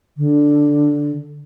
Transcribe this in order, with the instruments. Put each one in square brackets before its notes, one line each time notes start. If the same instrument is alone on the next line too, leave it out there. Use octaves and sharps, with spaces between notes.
[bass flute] D3